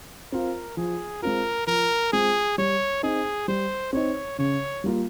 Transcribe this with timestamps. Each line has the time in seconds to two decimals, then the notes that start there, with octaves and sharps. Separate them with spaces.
0.32 C4 F4 A#4
0.77 F3 G#4
1.22 G#3 C4 F4 A#4
1.67 F3 A#4
2.12 G#3 C4 F4 G#4
2.58 G3 C#5
3.03 C4 D#4 G#4
3.48 G3 C5
3.93 C4 D#4 C#5
4.38 C#3 C#5
4.84 G3 A#3 F4